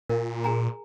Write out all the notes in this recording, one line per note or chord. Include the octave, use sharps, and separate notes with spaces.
A#2 A#4
G#4 G#5 A#5